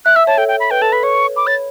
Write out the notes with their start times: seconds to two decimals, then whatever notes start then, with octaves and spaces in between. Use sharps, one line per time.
0.05 E5 F#6
0.16 E5 E6
0.27 C#5 A5
0.38 A4 G5
0.48 G5
0.60 B5
0.71 B4 G5
0.82 A4 A5
0.92 B4 B5
1.03 C#5 C#6
1.36 B5 D6
1.47 C#5 A6